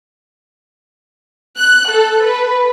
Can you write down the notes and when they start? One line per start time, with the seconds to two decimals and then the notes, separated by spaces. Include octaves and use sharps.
1.57 F#6
1.90 A4
2.23 B4